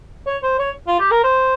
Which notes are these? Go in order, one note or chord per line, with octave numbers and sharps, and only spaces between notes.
C#5
C5
C#5
F4
G4
A#4
C5